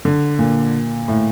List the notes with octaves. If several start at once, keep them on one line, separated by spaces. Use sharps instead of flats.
D3
A#2
A2